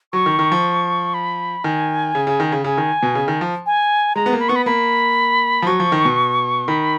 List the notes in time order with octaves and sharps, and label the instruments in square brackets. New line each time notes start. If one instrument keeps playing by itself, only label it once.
[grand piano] F#3 [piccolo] C#6
[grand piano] D#3
D#3
F3
[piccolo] B5
[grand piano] D#3 [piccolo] G#5
[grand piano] C#3
C#3
D#3
C#3
[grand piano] C#3 [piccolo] G#5
[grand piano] D#3
B2
C#3
D#3
F3
[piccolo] G#5
[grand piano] G#3 [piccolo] A#5
[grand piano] B3
A#3
[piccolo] B5
[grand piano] B3 [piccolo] C#6
[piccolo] B5
[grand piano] A#3 [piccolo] B5
[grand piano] F3
[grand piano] F#3 [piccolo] C#6
[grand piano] F3
D#3
B2
[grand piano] D#3 [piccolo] B5